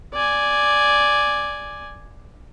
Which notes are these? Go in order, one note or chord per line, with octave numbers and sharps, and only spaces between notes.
D5 G#5